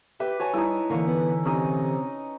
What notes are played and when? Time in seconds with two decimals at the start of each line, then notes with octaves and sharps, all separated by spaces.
0.20 G4 B4 E5
0.40 F#4 C#5 G#5 A5
0.53 G3 D#4 E4
0.90 D3 E3 A#3 C#6
1.06 B3
1.45 C3 C#4 D#4